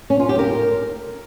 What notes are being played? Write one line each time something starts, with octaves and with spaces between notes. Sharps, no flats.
C#4
F4
G4
A#4